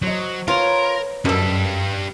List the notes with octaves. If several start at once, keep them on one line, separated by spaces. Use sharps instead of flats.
F#3 C5 D#5
F4 A#4 B4 C#5 A#5
F#2 B2 G3 D4 A4 D#5